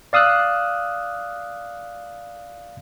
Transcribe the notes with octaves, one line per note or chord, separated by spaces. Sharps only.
D5 F5 D#6 E6 F#6